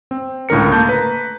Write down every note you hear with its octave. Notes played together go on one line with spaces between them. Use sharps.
C4
C#2 A2 D3 A#4 C#7
A3 A#3 A5 G6
B4 A#5